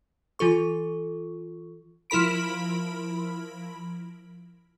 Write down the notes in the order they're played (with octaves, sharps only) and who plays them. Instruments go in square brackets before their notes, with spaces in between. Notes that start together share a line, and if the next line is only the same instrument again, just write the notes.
[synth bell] E3 F4 A4 C#6
F3 E4 A#4 B5 D7